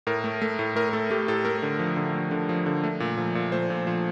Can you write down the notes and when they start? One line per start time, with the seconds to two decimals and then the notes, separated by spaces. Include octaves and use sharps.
0.07 A2 A#4
0.24 A3
0.42 A3
0.59 A2
0.76 A2 A#4
0.89 A#4
0.93 A3 A4
1.10 A3 G4
1.28 A2 A4
1.45 A3 A#4
1.63 D3
1.79 F3
1.97 D3
2.14 A3
2.31 D3
2.49 F3
2.66 D3
2.83 A3
3.00 A#2
3.18 F3
3.35 A#2
3.52 A3 C5
3.70 A#2
3.87 F3